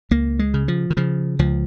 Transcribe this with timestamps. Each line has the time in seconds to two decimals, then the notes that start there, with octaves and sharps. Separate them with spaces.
0.11 C#2 A#3
0.39 G#3
0.54 C#3
0.68 F3
0.90 D#3
0.97 C#3 F3
1.39 C#2 F3